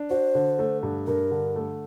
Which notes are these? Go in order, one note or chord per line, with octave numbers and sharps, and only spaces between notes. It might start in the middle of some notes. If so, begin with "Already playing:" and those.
Already playing: D4
F#4 C5
D3
A3
G2
G2 A#4
D3
A3